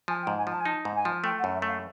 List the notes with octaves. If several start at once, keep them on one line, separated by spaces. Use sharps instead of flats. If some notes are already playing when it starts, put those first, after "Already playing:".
F3 G#5
G5
G#2
G#5
F3
A5
G#5
D#4 A5
G#2
G#5
F3
A3 G5
F#5
F#2
E5
A3
F5